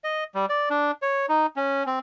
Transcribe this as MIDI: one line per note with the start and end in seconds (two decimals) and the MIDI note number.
0.04 0.24 75
0.35 0.46 55
0.49 0.69 74
0.70 0.91 62
1.02 1.26 73
1.29 1.46 63
1.56 1.83 61
1.86 1.99 60